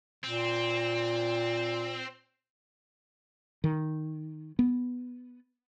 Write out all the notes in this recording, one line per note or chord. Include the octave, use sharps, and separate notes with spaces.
A#2 C4
D#3
B3